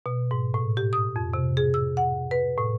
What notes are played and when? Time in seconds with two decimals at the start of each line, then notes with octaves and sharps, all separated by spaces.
0.06 B2
0.31 G#2
0.54 A2
0.77 G4
0.93 D#6
1.16 F2
1.34 C3
1.57 G#4
1.74 E6
1.97 F#5
2.31 B4
2.58 A2